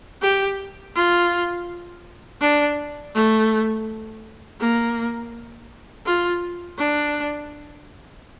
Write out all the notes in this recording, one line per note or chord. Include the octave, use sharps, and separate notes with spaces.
G4
F4
D4
A3
A#3
F4
D4